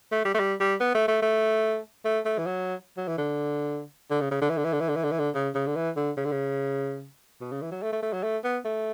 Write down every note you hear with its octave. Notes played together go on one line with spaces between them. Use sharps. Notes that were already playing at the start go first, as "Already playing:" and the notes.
A3
G3
A3
G3
G3
B3
A3
A3
A3
A3
A3
E3
F#3
F#3
E3
D3
D3
C#3
C#3
D3
E3
D3
E3
D3
E3
D3
E3
D3
E3
D3
C#3
C#3
D3
E3
D3
C#3
D3
C#3
B2
C#3
E3
F#3
A3
A3
A3
F#3
A3
B3
A3